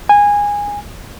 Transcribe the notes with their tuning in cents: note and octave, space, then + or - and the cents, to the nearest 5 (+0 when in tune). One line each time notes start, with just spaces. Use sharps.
G#5 -15